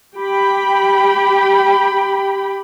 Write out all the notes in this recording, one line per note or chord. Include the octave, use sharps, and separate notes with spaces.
G4 G5 B5